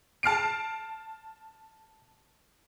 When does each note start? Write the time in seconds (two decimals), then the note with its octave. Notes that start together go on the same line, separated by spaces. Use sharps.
0.23 A5 F6 C7 D7